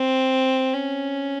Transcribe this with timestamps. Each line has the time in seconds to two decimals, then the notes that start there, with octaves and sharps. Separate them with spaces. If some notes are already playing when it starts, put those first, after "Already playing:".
Already playing: C4
0.74 C#4